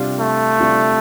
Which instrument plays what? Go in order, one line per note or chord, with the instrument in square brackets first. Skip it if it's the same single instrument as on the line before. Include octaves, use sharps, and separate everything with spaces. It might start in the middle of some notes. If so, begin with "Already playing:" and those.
Already playing: [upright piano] C3 G3 D4 F4
[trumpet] A3
[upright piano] C3 G3 D4 F4